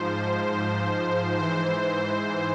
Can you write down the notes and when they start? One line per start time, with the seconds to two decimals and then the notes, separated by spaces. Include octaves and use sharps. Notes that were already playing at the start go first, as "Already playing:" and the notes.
Already playing: G#2 F3 C5
1.37 G#2 E3 C5